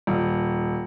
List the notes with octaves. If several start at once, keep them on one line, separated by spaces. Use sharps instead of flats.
D#1